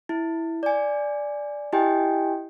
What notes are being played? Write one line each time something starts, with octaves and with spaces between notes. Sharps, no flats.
E4
D5 G#5
E4 G4 D#5 G5 G#5